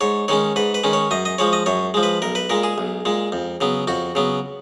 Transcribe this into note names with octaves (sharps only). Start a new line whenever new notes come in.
G#2 C#5
D#3 G#3 C#4 C#5
G#2 B4
B4
D#3 G#3 C#4
C#5
F#2 D#5
D#5
F3 G#3 C#5
D#5
F#2 C#5
F3 G#3
B4
B1 A#4
B4
A#2 G#3 A#4
G#4
B1
A#2 G#3
F2
C#3 F#3 B3
F2 F#4
C#3 F#3 B3